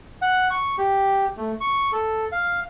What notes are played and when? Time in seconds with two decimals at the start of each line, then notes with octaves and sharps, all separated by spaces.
0.22 F#5
0.50 C#6
0.78 G4
1.37 A3
1.61 C#6
1.92 A4
2.32 F5